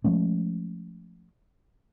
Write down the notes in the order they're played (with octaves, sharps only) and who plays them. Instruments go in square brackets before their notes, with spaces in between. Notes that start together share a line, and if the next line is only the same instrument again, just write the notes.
[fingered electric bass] F3 G#3 A3 C#4